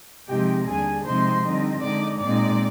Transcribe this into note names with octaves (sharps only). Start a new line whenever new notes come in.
C3 F3 G#3 C4 D#4 G4 G5
D#2 D3 G3 D4 G#4 G#5
C3 F3 G#3 C4 D#4 C5 C6
D3 G3 C4 D#4
D3 G#3 D#4 D5 D6
A#2 G#3 C4 D#4 D5 D6